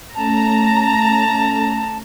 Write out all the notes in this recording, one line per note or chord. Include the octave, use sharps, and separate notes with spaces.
A3 C#4 A5 A#5